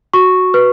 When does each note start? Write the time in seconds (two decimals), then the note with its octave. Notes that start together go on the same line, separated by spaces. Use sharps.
0.14 F#4 C#6
0.54 B4